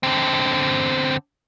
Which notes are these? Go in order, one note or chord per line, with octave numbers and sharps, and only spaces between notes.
D3 C4